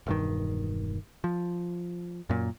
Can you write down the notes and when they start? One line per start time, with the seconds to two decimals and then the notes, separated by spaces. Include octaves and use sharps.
0.07 E1 G2 D#3
1.24 F3
2.29 F#2 A#2